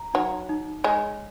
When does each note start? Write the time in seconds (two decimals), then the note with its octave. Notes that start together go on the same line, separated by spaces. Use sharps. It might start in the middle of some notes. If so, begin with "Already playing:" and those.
Already playing: A#5
0.14 F#3 D#4
0.49 D#4
0.84 G#3 C#5